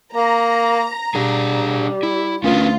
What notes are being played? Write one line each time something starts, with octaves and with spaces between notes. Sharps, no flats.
A#3 A#5
G3 D4 G#4
E4
D2 C#4 F4 A#4 B4